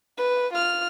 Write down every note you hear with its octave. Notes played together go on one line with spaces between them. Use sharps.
B4
F4 F6